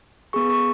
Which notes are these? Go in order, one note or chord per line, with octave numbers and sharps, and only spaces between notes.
B3 G#4 C#6
C#6